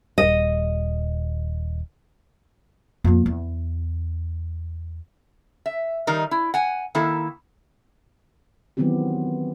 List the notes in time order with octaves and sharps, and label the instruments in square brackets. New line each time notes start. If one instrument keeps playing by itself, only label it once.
[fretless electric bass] D#1 G3 [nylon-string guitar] D#5
[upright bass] F2 A#3
E2
[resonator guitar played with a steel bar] E5
D#3 G3 D#4 A#4
E4
F#5 G#5
D#3 A#3 E4 A4
[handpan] D#3 E3 F#3 B3 C4 G4